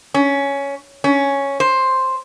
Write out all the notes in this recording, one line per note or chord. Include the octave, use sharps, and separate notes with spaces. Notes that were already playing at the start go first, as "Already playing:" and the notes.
C#4
C#4
C5